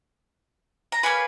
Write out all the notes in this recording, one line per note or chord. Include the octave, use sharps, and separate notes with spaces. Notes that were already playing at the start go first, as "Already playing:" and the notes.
A#5
A#3 C#4 G#4 B4 B5